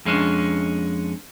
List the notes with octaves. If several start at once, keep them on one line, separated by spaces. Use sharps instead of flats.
F2 G#3 C#4 D4